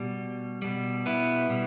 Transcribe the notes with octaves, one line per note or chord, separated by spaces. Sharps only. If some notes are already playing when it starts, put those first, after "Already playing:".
Already playing: B2 G3
B2 G3
B3 E4
B2 G3